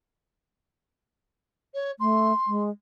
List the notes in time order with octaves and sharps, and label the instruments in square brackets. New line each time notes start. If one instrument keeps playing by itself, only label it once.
[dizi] C#5
[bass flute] A3 [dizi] C6
[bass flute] G#3